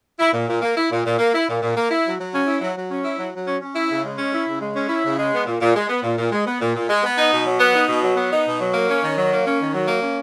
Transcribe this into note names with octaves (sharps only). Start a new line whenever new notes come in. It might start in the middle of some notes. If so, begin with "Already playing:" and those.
E4
A#2
A#2
A#3
E4
A#2
A#2
A#3
E4
A#2
A#2
A#3
E4
F#3
F#3
C#4
E4
F#3
F#3
C#4
E4
F#3
F#3
C#4
C#4
E4
C#3
G#3
C#4
E4
C#3
G#3
C#4
E4
C#3
G#3
B3
A#2
A#2
G#3
B3
A#2
A#2
G#3
B3
A#2
A#2
G#3
B3
D#4
B2
F#3
B3
D#4
B2
F#3
B3
D#4
B2
F#3
A#3
C#4
D#3
F#3
A#3
C#4
D#3
F#3
A#3
C#4